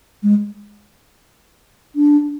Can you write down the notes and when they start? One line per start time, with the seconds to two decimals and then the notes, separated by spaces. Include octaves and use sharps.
0.23 G#3
1.95 D4